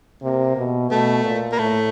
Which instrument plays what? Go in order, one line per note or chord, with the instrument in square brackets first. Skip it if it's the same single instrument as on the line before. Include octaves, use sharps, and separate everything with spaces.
[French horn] C3 [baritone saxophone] A#3
[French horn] B2
[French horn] B2 [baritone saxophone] A3
[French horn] A#2
[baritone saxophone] A#3
[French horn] A2 [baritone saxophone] A3